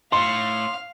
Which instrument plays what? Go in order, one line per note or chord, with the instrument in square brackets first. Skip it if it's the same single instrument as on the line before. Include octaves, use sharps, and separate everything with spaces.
[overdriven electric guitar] A2 [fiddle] F5 [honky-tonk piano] C6